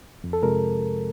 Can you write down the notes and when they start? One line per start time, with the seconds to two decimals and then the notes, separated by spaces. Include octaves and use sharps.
0.24 F2
0.33 A4
0.43 C3 F3 G#3 A#4